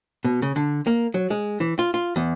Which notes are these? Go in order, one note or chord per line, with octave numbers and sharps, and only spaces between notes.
B2
C#3
D3
A#3
F#3
G#3
E3
F4
F4
E2